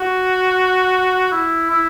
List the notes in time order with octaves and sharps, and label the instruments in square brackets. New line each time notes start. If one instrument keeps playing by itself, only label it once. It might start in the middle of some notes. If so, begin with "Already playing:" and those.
Already playing: [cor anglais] F#4
E4
E4